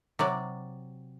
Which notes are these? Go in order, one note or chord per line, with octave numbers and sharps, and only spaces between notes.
C3 F#3 D5